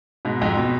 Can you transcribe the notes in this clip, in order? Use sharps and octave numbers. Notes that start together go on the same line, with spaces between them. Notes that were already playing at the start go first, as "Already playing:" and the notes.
G#2 B2
F2 G#2
B2